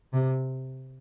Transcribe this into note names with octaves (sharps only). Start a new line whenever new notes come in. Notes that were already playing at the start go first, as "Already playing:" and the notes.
C3